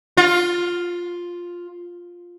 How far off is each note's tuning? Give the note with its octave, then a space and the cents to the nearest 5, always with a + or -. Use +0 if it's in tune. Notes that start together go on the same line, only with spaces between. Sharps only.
F4 +5